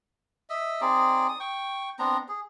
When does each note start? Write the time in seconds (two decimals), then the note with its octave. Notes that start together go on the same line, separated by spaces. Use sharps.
0.50 D#5 E5
0.81 C4 D#4 G#4 D5
1.28 D#6
1.40 G5 C#6
1.99 B3 C4 D4 A#5
2.28 G#4